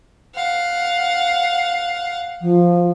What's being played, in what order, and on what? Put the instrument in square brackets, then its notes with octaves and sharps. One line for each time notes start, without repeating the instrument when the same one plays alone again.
[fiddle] F5 F#5
[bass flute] F3